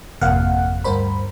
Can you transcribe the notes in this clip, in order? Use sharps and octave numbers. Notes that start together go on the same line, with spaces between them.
G#1 F2 C3 A#3 F5 F#5
D2 G2 A#4 C5 B5